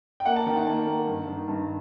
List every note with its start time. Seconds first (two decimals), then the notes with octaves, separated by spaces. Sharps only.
0.20 G5
0.25 A#3 F#5
0.36 A5
0.46 D#3 G5
0.56 F#5
0.67 A#3 A5
0.87 A#3
1.07 G2
1.27 D#3
1.48 G2